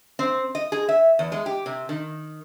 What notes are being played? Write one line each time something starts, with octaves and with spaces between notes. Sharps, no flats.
C4
D#5
G#4
E5
E2
G#3
G4
C3
D#3